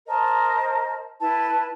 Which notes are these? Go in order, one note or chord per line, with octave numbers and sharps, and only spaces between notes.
A#4 C5 D#5 A5
E4 B4 A5